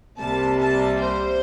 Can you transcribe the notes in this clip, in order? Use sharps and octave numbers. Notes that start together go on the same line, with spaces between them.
C2 C3 G3 A#3 A5
A5
C5